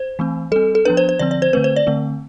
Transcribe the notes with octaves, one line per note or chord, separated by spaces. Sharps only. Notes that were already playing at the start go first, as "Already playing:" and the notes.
Already playing: C5
E3 A3 C4
G3 C4 A4
A4
F3 B3 D4 B4
C5
C5
D3 F3 C4 D5
D5
C5
D3 A3 C4 B4
C5
D5
D3 A3 C4